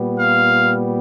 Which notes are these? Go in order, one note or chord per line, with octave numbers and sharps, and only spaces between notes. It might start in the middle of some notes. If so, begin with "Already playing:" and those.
Already playing: A#2 G3 B3
F5